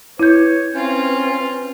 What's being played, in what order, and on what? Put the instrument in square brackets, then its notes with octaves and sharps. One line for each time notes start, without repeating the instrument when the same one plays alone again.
[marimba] E4 G6 [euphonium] B4 [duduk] C#5
[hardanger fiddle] C4 F4 [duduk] C#4